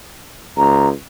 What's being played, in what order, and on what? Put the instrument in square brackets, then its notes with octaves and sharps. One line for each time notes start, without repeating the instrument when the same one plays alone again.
[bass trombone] C#2 [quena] A#5